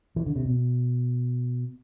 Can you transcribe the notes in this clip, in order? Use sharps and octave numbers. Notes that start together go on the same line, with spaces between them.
E3
D3
C3
B2